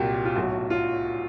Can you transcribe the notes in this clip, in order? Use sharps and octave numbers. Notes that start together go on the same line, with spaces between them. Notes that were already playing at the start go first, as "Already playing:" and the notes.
Already playing: C2 A#2 F#3 G4
F4
B1 A2 F#3 F#4
F4